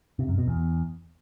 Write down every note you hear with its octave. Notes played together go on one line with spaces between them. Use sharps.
C3
F#2
B2
E2